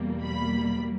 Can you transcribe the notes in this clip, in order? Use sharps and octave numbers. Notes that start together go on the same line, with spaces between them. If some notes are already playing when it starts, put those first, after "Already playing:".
Already playing: E2 B2 G3 A#3
B5